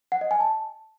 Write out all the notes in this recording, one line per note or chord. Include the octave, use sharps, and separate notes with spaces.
F#5
D#5
G#5
A5